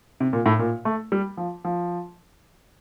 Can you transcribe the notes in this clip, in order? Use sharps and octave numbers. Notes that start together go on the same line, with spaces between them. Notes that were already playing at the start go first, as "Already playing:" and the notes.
C3
A#2
A2
A#2
A3
G3
F3
F3